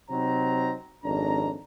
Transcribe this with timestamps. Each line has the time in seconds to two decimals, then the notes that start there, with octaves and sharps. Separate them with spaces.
0.10 C3 F#3 C4 D#4 A#5
1.04 G#1 F2 C#4 D4 A#5